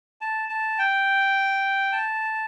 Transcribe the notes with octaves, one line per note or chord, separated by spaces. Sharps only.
A5
A5
G5
A5